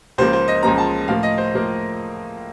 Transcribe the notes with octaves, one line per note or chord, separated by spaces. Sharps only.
C#2 C#3 F3 A#3 C5
C5
D#5
C#2 C#3 F3 A#3 A#5
A5
A2 F3 A#3 F5
D#5
C5
A2 F3 A#3